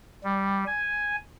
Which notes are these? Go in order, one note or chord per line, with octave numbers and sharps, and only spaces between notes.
G3
G#5